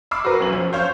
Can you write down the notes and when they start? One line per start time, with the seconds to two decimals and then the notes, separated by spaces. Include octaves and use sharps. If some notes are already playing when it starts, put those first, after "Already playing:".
0.11 B5 C#6 D6 E6 C7
0.24 F#4 A#4 B4
0.40 B1 C#4 F#7
0.52 F3
0.73 C5 C#5 F5 C#6 G6